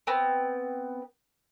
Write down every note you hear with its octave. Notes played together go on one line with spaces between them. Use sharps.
B3 C4